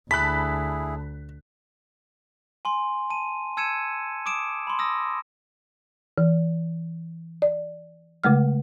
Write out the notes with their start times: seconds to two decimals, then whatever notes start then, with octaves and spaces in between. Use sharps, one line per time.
0.11 D2 E4 G#4 A5 B5 F#6 B6
2.65 G#5 C6
3.10 A5 D#7
3.57 A5 E6 G#6 C#7 D#7 E7
4.26 D6 D#6 D7 E7
4.67 B5 C6
4.79 D#6 E6 A#6
6.18 E3
7.42 D5
8.24 C#3 G#3 A3 F6